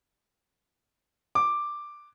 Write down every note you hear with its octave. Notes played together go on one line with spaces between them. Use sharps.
D6